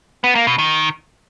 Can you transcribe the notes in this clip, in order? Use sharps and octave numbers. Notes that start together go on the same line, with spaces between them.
B3
A#3
B2
D#3